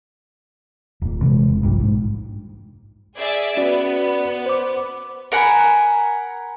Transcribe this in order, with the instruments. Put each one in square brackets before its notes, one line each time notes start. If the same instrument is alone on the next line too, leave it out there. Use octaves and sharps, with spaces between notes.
[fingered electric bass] D#1 A#2
C3 E3 F3 G#3
E1
A#1 G2 A#2
G#2
[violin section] G#4 D5 E5
[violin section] B3 [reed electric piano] C#4 F#4 D5
[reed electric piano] C5 D6
[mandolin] A#4 F#5 G#5 B5